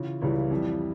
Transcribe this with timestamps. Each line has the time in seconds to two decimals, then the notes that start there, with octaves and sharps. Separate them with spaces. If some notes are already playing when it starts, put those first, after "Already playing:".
Already playing: C#3 E3 F4
0.21 C#2 C#3 E3 G3 E4
0.51 F2 E3 G3